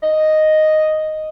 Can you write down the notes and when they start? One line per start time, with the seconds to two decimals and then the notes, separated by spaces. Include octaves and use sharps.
0.03 D#5